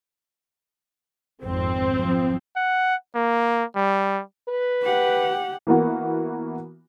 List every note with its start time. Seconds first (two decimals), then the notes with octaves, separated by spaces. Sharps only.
1.44 G#1 F2 C4
1.95 F3
2.56 F#5
3.15 A#3
3.76 G3
4.48 B4
4.83 G4 F#5
5.67 E3 A#3 B3 F#4